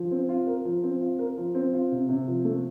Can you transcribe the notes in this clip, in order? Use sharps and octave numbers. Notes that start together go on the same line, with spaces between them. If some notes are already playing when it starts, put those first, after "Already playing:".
Already playing: F3
C4
F4
A#4
F3
C4
F4
A#4
F3
C4
F4
C3
C3
F3
A3